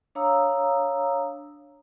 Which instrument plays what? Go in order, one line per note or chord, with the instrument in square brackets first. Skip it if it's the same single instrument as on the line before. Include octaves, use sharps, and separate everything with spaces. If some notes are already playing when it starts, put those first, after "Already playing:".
[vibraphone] D4 C#5 F5 A#5 D#6 E6